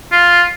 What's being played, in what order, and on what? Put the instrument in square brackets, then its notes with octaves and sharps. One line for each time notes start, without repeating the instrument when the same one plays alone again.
[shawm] F4